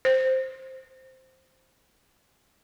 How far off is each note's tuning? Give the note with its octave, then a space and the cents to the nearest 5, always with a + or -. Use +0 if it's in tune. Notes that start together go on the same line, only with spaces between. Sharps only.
C5 +0